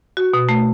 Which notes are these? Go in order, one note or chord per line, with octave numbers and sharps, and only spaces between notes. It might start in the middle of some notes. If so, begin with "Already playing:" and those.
F#4
B2
A3